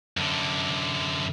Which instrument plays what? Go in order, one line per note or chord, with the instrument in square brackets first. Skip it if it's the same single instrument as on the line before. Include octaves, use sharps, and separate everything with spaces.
[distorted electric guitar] F#2 D3